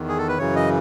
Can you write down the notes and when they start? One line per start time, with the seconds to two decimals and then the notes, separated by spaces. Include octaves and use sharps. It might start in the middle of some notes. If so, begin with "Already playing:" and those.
Already playing: E2 D#3
0.08 G#4
0.18 A4
0.29 B4
0.38 F#2 C#3 E3 C#5
0.56 D#5